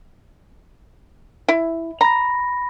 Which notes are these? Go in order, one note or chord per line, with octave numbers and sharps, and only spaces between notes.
E4
A#5 B5 A#6